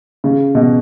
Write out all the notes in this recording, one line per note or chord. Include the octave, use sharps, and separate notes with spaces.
C#3
B2